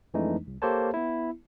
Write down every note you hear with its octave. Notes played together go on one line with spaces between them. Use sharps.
F2 E3 G#3 A3 D4 D#4
C2
A#3 G4 A4 C5 C#5 A5
B3 E4